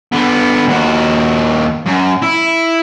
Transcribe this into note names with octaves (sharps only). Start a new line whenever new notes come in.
D3 B3
D#2 F#4
F#2
E4